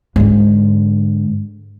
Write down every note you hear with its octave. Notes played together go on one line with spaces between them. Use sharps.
G#2 D3